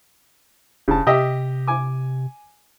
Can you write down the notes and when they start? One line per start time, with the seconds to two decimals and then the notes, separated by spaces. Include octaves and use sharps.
0.88 E1 C#3 A5
1.07 C3 G4 D#5 E5
1.67 G#5 D6